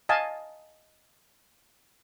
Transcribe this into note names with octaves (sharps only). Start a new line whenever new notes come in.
D#5 F5 G#5 A5